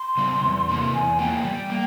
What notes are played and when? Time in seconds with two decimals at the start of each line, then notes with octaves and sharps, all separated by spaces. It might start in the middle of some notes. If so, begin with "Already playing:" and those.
Already playing: C6
0.17 C#3 G3 C4
0.43 E2
0.69 C3 E3 A#3
0.93 E2 G#5
1.19 E3 A#3 F4 G5
1.44 G3
1.70 A#3